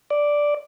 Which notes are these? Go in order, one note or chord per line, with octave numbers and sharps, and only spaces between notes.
D5